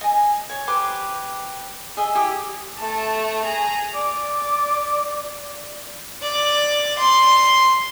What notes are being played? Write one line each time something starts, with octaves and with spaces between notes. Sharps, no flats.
D#5 G#5
C#5
G4 B4 C5 D6
G#4 D#5 E5
E4 G4 D#6
A3 A5
G#4 A#5
D5 D6
D5
C6